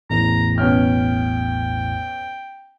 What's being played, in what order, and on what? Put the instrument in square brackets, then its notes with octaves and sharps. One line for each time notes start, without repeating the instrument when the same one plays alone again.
[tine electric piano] A1 E2 A2 [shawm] A#5
[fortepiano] B2 C#4 F6 [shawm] G5